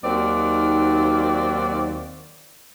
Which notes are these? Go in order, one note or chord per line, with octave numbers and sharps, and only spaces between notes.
D#2 D#3 F#3 C4 F#4 D5